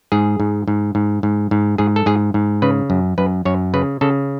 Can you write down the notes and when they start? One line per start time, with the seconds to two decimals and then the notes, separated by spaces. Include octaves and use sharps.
0.12 G#2 G#4
0.40 G#2
0.68 G#2
0.95 G#2
1.23 G#2
1.51 G#2
1.78 G#2 G#4
1.96 A4
2.06 G#2 G#4
2.34 G#2
2.62 C#3 B4
2.90 F#2
3.18 F#2 B4
3.45 F#2 C#5
3.74 C#3 B4
4.01 C#3 A4